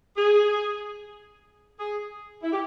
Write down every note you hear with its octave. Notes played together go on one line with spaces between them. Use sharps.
G#4
G#4
E4
G4